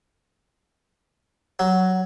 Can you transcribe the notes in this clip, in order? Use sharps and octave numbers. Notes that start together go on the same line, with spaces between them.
F#3